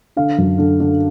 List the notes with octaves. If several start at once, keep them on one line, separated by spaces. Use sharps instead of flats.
D3 F5
F#2
D3
D3